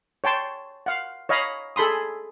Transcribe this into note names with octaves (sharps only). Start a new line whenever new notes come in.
C#5 G5 A5 C6
F5 F#5
C#5 D#5 F5 A#5 B5
G#4 A4 B5 C6 D#6